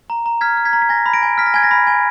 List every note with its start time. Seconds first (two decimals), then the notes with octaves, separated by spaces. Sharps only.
0.10 A#5
0.26 A#5
0.41 F6 G#6 B6
0.57 F6
0.65 G#6 B6
0.73 A#5
0.82 B6
0.89 G#5 A#6
1.06 B5
1.14 A#6 D7
1.22 G#5
1.38 F6 B6
1.46 A#6
1.54 G#5 G#6
1.63 A#6
1.71 B5
1.87 G#5